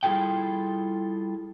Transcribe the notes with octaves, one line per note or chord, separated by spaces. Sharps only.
G3 E4 F4 G#4 A4 G5